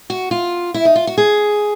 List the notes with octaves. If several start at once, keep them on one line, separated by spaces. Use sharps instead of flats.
F#4
F4
E4
D#4
F4
F#4
G#4